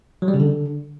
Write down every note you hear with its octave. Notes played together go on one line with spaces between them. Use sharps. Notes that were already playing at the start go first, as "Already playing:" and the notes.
F#3
G3
C#3
D3